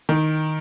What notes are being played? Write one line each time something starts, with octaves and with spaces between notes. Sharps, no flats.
D#3